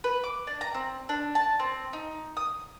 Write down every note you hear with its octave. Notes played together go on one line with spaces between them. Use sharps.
B4
D6
D4
A#5
C4
D4
A5
C4
D#4
D#6